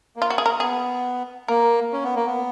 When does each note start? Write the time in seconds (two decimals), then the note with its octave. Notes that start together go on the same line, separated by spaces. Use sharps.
0.16 A#3
0.22 F4
0.30 F#4
0.38 G#4
0.46 A#4
0.60 B3 G#4
1.48 A#3 A#4
1.93 C#4
2.04 B3
2.16 A#3
2.26 B3